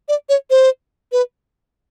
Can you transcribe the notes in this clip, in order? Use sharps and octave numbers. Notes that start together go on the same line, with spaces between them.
D5
C#5
C5
B4